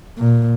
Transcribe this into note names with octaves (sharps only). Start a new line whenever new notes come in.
A#2